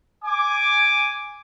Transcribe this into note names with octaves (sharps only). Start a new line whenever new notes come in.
G#5 D6